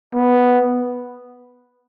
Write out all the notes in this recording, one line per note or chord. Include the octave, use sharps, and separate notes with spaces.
B3